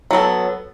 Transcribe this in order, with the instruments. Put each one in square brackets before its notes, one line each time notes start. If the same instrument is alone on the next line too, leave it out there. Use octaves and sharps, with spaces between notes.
[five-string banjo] F#3 B3 A4